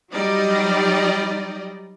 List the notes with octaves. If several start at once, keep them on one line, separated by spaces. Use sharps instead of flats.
F#3 G3 D#4 D5 D#5